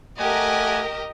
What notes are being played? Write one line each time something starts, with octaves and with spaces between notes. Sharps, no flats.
A3 G4 A#4 D#5 F#5 G#5